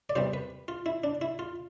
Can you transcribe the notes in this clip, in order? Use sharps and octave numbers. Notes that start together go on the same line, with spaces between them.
D5
E2 C3 E3 G3 C5
B4
F4
E4
D4
E4
F4